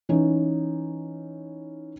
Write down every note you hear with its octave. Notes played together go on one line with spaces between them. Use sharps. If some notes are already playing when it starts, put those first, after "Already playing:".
E3 C#4 D#4